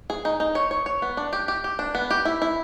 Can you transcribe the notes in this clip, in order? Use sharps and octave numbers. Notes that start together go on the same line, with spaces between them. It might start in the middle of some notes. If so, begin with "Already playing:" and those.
G#4
D#4
D#4
C#5
C#5
C#5
B3
D4
G4
G4
G4
D4
B3
G4
E4
E4